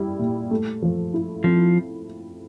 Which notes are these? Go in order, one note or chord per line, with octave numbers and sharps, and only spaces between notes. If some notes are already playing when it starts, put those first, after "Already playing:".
Already playing: G3 E4
A#2
A3
F3
E4
F3 C4